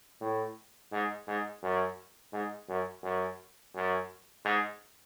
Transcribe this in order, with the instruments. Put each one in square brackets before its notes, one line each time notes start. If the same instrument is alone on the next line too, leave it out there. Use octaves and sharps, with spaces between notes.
[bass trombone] A2
G#2
G#2
F#2
G#2
F#2
F#2
F#2
G#2